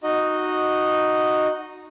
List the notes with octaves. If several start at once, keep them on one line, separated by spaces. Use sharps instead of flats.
D#4 F#4 D#5